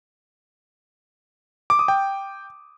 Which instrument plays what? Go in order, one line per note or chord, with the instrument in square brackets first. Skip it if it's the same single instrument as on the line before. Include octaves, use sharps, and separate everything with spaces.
[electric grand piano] D6
D#6
G5